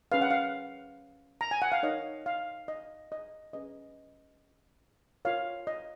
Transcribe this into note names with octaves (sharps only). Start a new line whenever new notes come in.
C#4 G#4 B4 F5
F#5
F5
A#5
G#5
F#5
F5
D#4 A#4 C#5 D#5
F5
D#5
D#5
C#4 G#4 B4 D#5
F4 A#4 C#5 F5
D#5